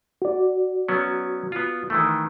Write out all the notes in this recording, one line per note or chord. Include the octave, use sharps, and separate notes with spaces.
F#4 D5
F#3 B3 C#4
B3 F4
D#3 E3 A3